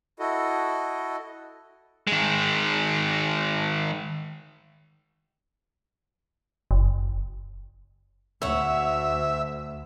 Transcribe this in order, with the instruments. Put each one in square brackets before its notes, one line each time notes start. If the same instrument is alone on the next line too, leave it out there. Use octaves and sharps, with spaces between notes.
[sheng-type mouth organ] E4 F#4 A4 D#5
[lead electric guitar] D#3 G#3
[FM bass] F#1
[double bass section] D2 [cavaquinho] C#5 F#5 [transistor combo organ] E5